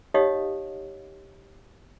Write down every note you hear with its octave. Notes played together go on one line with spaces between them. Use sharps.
D#4 G4 C#5 D#5 F5 D#6